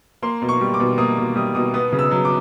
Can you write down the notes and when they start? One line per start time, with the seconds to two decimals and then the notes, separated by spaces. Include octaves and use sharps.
0.22 A#3 C6
0.42 B2
0.49 C#6
0.61 G3
0.74 D6
0.80 B2
0.98 A#3 D#6
1.18 B2
1.36 G3 D#6
1.55 B2 D#6
1.74 B3 D#6
1.92 C#3
1.99 E6
2.11 F#3
2.25 D6